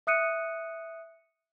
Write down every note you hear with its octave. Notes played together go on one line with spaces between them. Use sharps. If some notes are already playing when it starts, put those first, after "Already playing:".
E5 D#6 F#6 C#7 D#7